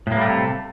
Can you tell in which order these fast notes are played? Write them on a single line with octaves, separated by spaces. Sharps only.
A2 A#3 G3 A3 C3